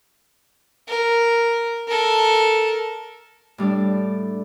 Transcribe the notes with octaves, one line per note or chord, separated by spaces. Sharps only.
A#4
A4 A#4
A2 G3 D4 D5